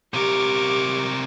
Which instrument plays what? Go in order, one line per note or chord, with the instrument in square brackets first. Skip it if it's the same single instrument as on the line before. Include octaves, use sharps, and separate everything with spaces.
[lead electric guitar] C3 A#4 [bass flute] G4 [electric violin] C#6 D6